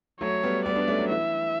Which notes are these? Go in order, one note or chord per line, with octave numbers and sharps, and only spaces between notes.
F#3 A3 C#5
G3 B3
G3 B3 D5
B3 D4
A3 C#4
F#3
E3 E5